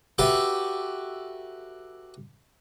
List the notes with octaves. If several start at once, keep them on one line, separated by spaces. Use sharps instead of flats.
F#4 G4 A4 B4 E5